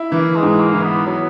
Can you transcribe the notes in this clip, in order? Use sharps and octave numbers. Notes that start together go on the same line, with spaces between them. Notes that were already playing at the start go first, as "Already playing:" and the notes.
Already playing: E4
E3 A#3
G#3
G#2
A#3
E3
B3
F#3 B3